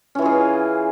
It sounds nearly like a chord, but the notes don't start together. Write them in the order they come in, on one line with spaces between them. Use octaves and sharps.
C#4 E3 F4 G#4